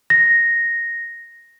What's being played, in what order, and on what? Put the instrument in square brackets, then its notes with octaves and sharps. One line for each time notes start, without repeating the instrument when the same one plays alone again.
[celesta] A#6